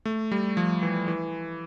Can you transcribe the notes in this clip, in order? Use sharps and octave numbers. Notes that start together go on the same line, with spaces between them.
A3
G3
F3
E3
E3